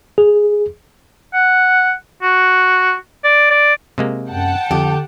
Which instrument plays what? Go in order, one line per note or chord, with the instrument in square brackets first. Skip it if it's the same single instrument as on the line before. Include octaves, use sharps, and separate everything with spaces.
[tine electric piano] G#4
[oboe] F#5
F#4
D5
D5
[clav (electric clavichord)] C3 G#3 A#3
[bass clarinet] F#2 [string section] F#5 G5 A5
[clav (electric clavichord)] F2 [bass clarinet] D3 [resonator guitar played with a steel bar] G4